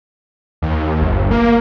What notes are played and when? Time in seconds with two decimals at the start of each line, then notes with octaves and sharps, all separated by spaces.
0.62 D#2
1.02 G1
1.31 A#3